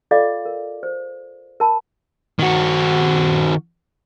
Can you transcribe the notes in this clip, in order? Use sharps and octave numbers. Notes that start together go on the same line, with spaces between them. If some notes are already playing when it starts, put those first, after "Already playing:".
F4 A4 D5 D#5 F5 D6
A#4
C5
A#4 A5 B5
D#3 F#4